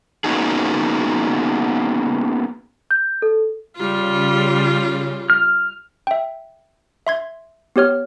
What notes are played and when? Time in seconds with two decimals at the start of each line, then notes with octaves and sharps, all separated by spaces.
0.24 A#3 B3 C#4 D#4 F#4 G#4
2.91 G6
3.22 A4
3.76 C#3 G3 F4
5.30 F6
6.07 E5 G5
7.07 E5 C6 G#6
7.76 B3 G4 C#5 F6